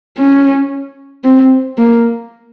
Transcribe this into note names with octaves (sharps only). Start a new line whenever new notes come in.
C#4
C4
A#3